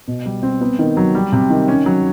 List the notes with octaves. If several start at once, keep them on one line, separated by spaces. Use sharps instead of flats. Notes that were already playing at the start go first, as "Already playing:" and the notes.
B2
G3
C4
B3
D#3
F#3
G3
C3
D#3
C#4
F#3